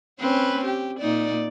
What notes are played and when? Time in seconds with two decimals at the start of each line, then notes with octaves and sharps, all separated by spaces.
0.20 C4 C#4 B4
0.65 G4
1.00 A#2 D#4 D5